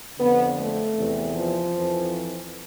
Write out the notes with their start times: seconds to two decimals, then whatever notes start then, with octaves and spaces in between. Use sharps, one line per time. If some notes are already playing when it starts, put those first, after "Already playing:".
0.18 F2 D3 B3
0.57 A3
0.96 E2 C3 E3
1.35 F3
1.75 F2 E3